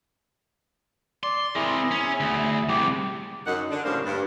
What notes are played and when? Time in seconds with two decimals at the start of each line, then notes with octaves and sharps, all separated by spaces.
1.23 D5 C6
1.55 C4 E4 G#4 A#4
1.91 C#4
2.20 D2
2.69 C2 C3 G4
3.46 F#2 D#4 F#5
3.71 D3 D4
3.84 A2 C#3 G3 A#3 C5 F5
4.05 G2